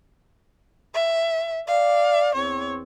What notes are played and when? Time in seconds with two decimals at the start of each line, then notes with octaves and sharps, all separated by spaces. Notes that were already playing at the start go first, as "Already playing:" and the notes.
0.94 E5
1.67 D5 F5
2.35 E2 C4 C#5